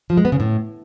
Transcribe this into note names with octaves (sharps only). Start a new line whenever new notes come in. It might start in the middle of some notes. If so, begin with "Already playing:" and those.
F3
G#3
B3
C#3
A2